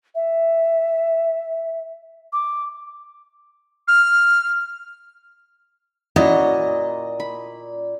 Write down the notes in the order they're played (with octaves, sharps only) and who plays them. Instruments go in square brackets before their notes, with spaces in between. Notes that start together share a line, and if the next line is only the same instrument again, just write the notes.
[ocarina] E5
D6
[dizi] F6
[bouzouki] A#2 [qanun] C#4 E4 F#4 [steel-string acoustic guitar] D#5
[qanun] B5